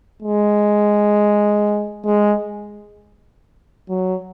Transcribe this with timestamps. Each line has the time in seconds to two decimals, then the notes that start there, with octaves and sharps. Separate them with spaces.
0.23 G#3
2.06 G#3
3.89 F#3